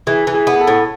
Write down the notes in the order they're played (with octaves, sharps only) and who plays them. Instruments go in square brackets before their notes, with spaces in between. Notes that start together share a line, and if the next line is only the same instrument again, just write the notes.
[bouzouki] E3 [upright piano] G#4
[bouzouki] E3
[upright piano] G#4
[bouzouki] B3
[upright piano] G#4
A4
[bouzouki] A2